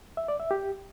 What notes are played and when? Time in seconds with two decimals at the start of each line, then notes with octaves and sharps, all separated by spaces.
0.17 E5
0.28 D5
0.40 E5
0.51 G4